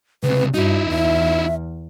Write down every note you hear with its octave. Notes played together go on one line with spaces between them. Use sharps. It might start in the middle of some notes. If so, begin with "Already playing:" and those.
C#2 C3 B4
G2 D#4 E4 F#4
E2 E5